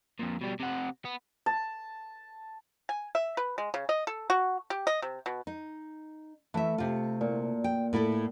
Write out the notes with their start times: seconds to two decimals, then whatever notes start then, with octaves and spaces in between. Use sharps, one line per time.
0.20 F2 A#2
0.41 B2 G3
0.60 C3 F#5
1.05 B3
1.46 A5
2.89 G#5
3.15 E5
3.37 B4
3.58 G#3
3.74 C#3
3.89 D#5
4.07 A4
4.30 F#4
4.70 G4
4.87 D#5
5.02 C3
5.26 B2
5.47 D#4
6.54 E3 A3 E5
6.78 C3 F4
7.21 A#2
7.64 G5
7.93 A2 E4 A4